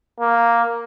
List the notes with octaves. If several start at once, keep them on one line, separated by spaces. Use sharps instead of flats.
A#3